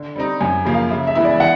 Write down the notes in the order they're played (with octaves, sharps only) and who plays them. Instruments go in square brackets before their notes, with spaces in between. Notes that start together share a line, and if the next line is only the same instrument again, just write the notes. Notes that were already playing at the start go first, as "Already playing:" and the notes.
Already playing: [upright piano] D3
G3 C4 D#4
[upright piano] F#2 [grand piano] G#5
[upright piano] C#3 F3 A#3
[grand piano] F5
[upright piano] C#3 [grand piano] E5
[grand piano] E5
[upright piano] E3 G#3 B3 E4
[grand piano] D5
[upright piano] E3 [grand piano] F#5